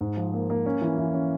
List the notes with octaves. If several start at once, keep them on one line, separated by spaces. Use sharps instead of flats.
G#2
F3
A#3
A#3
C#4
E3
E3
C#4